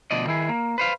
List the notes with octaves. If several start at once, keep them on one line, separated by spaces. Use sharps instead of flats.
D2 B2 F3 D5 D#5
D#3 E4 G#4
A#3
B4 C5 F5